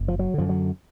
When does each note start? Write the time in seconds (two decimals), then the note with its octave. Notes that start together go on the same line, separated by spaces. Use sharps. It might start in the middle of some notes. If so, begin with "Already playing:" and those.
Already playing: F#1
0.08 F3
0.19 F#3
0.34 F#2 D3 F3
0.49 F#3